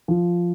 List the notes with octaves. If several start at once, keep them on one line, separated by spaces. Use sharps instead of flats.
F3